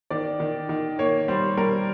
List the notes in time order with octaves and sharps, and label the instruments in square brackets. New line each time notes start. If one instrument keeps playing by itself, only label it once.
[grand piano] D#3 D5
D#3
D#3
A#3 C#5
G3 C5
G3 A#4